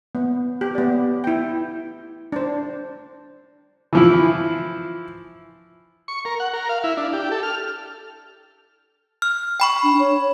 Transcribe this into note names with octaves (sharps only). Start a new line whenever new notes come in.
B3
G4
B3 D5
E4 G5
D4 C5
E3 F3 E4
C#6
A#4
F#5
A#4
F5
E4
D4
G4
A4
F6
F6
G5 B5 C#6
D4
C#5